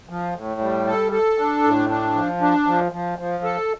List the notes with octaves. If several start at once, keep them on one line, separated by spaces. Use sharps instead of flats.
F3
A2
G3
A4
A4
D4
A2
D4
F3
D4
F3
F3
F3
A4